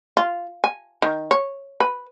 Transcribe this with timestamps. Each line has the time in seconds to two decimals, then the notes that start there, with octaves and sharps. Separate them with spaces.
0.17 F4
0.64 G#5
1.02 D#3
1.31 C#5
1.80 B4